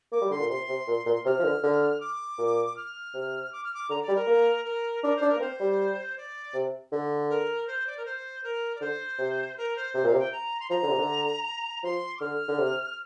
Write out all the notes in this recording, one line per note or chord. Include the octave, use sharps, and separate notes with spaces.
A#3 D6
G3
D3 C6
A#2
C3 C6
C3
A#2
A#2
C3 F6
F3
D3
D3
D6
A#2
F6
C3
D6
F6
D6
D3 A#5
D5
G3
A#4
A#3
A#4
D4 A#4
C5
D4
A#4
A#3
C4 C5
G3
D5
C3
D3
A#4
C5
D5
A#4
C5
A#4
D5
D3 C5
C3
A#4
C5
C3 C5
A#2 F5
C3
G5
A#5
C6
F3 A#5
D3
C3
D3
F3 C6
D6
D3 F6
D3
C3